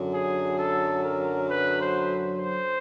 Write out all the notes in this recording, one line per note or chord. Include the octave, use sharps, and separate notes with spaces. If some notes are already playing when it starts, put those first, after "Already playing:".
Already playing: F#2 D3 F#3
G#4
A4
A#4
B4
C5
C5